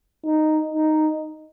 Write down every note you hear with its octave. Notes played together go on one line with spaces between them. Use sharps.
D#4
D#4